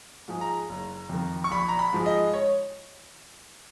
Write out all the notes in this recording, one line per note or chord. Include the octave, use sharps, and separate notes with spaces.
G#2 F3 G#3
A#5
F#1
F2 D#3
C#6
A#1 B5
A#5
B5
G#2 F3 G#3
D#5
C#5